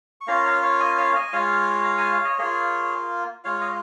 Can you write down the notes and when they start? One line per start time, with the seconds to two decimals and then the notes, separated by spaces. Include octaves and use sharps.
0.21 C#6
0.27 A#3 C#4 F4 F5 A#5
0.45 C#5 F5
0.62 C#5 F5
0.80 D#5 G#5
0.98 C#5 F5
1.15 D#5 G#5
1.33 G#3 F4 C#5 F5
1.84 A#5
1.98 G#5
2.12 F5
2.25 D#5
2.39 A#3 F4 G#4 C#5
3.44 G#3 F4 C#5 F5
3.61 D#5